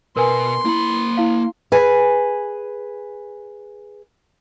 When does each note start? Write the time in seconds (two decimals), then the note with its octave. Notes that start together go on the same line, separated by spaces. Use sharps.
0.16 B2 A#4 B4 G#5 C6
0.65 A#3 E4 B5
1.17 E4 F5
1.72 G#4 B4 G#5